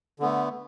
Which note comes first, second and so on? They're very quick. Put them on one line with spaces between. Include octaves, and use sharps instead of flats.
D3 B3 A3